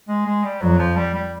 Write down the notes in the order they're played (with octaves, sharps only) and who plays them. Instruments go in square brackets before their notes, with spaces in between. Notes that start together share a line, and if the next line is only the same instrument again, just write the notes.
[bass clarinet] G#3
G#3
G3
[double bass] F2 [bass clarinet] F#3
[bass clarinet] F3
G3
G3